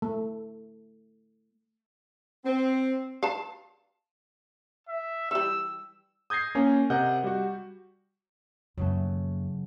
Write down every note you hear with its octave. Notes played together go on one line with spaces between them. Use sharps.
A3
C4
F5 A5
E5
E3 G3 E6
D#6 G6 G#6 A#6 C7
A#3 C#4 G#5
C3 A#4 D#5 F#5 G6
G3 F#4
F#2 C#3 F#3 A3 A#3